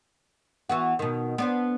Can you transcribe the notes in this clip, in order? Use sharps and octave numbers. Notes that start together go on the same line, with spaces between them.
E3 B3 F#4
B2 D#3
B3 D4 C5